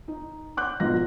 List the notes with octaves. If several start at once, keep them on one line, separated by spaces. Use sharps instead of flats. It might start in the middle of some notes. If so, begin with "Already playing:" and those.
D#4
D6 F#6 G6
G#1 G#2 B2 F4 A#6